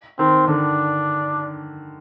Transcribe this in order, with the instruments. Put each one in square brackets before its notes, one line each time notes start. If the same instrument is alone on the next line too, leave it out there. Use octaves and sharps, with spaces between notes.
[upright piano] D#3 [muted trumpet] C4
[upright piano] D3 [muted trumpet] D4